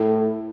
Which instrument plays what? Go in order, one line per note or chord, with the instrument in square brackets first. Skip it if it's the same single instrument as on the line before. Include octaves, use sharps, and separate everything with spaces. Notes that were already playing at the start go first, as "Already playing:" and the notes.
Already playing: [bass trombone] A2 [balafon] E4 A4